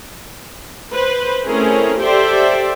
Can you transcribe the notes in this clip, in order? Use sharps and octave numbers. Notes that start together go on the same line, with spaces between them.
B4 C5
A3 C4 C#4 E4 G#4 A#4
G4 A4 C5 D5 E5 G5